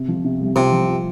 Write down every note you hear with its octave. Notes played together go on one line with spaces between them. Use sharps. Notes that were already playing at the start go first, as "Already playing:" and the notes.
Already playing: C3
F3
C3
C2
C3 F4
F3
F4